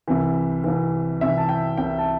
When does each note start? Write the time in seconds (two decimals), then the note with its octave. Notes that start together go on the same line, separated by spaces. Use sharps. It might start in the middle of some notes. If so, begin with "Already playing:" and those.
0.08 C2 C3 E3
0.64 C2 C3 E3
1.21 C2 C3 E3 E5
1.38 A5
1.49 G5
1.77 C2 C3 E3 G5
1.99 A5